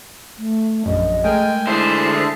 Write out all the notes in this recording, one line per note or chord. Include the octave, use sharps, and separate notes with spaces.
A3
A#1 F#2 D#5
G#3 A3 A#4 G5 G#5
D3 E4 G#4 C5 E5 A5